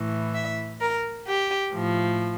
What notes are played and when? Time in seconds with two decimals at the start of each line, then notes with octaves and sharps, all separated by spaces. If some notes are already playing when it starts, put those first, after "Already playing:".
Already playing: A2 E3
0.34 E5
0.81 A#4
1.27 G4
1.75 A2 F3